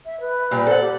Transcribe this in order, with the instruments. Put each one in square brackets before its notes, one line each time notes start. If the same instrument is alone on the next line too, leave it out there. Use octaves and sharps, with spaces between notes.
[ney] E5
B4
[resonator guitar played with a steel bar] A#2 G3
[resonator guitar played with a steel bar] A4 F#5 [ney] C5
[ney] G4